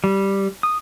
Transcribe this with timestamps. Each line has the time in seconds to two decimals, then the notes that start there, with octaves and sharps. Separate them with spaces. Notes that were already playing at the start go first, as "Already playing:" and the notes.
0.04 G3
0.63 D#6